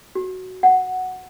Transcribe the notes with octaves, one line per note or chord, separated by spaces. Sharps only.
F#4
F#5